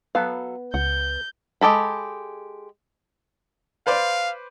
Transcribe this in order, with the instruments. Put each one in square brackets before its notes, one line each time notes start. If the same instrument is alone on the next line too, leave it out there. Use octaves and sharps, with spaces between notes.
[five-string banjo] F#3 A4 F5 [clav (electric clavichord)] B3
[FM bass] C#2 [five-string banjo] F#5 [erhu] G6
[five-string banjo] G#3 G4 A4 B5
[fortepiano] B4 C5 D5 [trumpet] F5